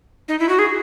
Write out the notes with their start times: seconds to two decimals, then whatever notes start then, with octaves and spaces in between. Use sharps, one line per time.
0.28 D#4
0.39 E4
0.49 F#4
0.59 G#4